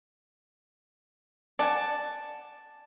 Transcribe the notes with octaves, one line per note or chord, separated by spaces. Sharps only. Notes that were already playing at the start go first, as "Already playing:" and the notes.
D5 F#5 G#5 A5